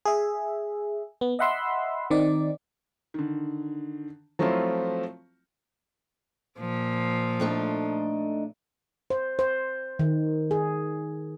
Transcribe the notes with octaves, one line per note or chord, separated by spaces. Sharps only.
G#4 E5
B3
D#5 E5 F#5 B5 C6 E6
D#3 C4 D#4 D5
D3 D#3
F3 F#3 A3 C4 E4 F4
A#2 F3
A3 D4 D#4
C5
C5
D#3
G#4